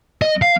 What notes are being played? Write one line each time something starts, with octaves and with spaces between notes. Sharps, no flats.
D#5
F5